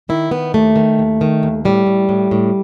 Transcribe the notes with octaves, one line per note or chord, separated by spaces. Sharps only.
D#3 E4
D#3 B3
D#2 A3
D#3
D#2
D#3
D#2
A2 G3
A2
A2
A2